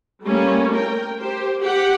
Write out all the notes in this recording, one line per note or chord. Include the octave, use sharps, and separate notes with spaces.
G3 A3 A#3 C#4
A#4 G5
G4 C5
G4 F#5